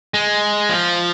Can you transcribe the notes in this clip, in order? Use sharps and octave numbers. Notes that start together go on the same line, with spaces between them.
G#3
F3